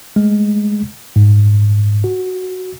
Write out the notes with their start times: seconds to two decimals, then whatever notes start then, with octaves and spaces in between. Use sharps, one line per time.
0.16 G#3 A3
1.16 G#2
2.04 F#4